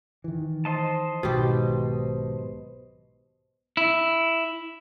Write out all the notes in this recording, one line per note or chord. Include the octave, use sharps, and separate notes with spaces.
D#3 E3
C5 D#5 A5
B1 G#2 B2 D#3 G4
E4